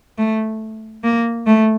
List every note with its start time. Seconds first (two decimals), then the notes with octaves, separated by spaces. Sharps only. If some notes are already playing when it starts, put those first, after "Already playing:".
0.18 A3
1.04 A#3
1.47 A3